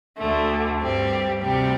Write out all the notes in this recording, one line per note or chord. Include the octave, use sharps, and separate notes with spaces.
D2 D3 A3
G2 G3 C4 G4
D2 C3 G3 C4 G4